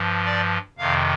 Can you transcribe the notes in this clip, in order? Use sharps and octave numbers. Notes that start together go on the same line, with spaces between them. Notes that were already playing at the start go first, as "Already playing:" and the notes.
Already playing: G2 F3
D5
F2 C3 D#3 F5